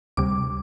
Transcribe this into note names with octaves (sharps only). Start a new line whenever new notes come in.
D2 C3 G3 D6